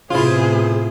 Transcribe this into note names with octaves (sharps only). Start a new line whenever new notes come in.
A2 C3 F3 B3 E4 F4 G#4 C5